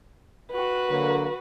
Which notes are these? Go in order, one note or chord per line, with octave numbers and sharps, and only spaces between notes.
F#4 B4
D3 F#3 A#3